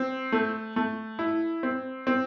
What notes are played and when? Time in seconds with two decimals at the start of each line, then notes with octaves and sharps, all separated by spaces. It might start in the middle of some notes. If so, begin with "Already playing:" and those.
Already playing: C4
0.32 A3
0.76 A3
1.19 E4
1.63 C4
2.07 C4